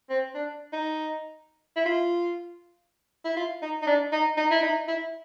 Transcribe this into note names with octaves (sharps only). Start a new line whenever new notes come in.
C4
D4
D#4
E4
F4
E4
F4
D#4
D#4
D4
D#4
D#4
E4
D#4
E4